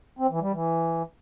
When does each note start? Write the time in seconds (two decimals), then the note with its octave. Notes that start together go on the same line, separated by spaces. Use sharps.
0.19 C4
0.30 E3
0.41 G3
0.52 E3